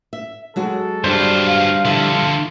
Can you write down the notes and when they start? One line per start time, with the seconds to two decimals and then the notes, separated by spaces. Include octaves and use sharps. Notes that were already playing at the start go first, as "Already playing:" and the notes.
0.13 E5
0.56 F#3 G#3 F#4 A4
1.04 G2 G3 D4 F4 C5
1.46 F5
1.85 D3 F3 E4 F4 A4 E5